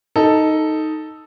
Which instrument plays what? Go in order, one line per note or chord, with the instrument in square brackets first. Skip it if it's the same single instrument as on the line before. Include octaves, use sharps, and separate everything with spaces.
[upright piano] D#4 [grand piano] A4